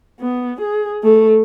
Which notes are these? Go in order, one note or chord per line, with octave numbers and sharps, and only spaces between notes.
B3
G#4
A3